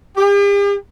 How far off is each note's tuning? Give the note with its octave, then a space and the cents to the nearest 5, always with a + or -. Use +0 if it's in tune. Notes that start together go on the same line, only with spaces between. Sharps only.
G4 +45